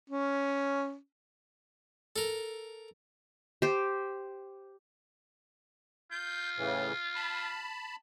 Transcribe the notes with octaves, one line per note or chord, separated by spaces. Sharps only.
C#4
A4 A#4
G4 C5
F4 G6
A2 C#3 E3
A5 B5